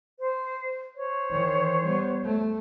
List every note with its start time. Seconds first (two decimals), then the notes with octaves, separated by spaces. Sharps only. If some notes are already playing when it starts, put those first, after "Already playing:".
0.18 C5
0.96 C5 C#5
1.30 D#3 E3
1.83 G3 B3
2.24 A3